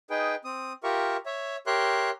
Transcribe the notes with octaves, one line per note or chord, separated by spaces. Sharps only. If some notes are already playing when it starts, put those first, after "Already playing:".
D#4 G#4 B4 G5
C4 D#6
F4 G4 A#4 E5 C#6
C#5 E5
G4 A#4 C#5 E5 C6 F#6